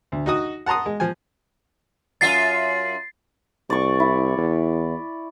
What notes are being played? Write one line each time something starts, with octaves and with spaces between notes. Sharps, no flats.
D2
D#4 F#4 D#6
F#5 A5 A#5 C6 D#6
G#3
F3 G#5
F#2 F4 E5 A6 C7
C2 D5 C#6
E4
E2